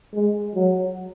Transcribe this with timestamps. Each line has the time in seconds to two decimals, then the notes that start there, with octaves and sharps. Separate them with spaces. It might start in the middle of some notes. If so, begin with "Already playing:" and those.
0.14 G#3
0.55 F#3